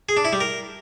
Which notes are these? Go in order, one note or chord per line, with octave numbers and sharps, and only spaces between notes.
G#4
D4
E4
G3
A#4